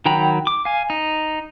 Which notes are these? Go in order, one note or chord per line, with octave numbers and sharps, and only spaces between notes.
D#3 F#3 G5 A#5 B5
D6
F5 G#5
D#4